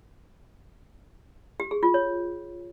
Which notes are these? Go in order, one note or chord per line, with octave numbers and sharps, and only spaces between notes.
G4
G#4
F4
C#5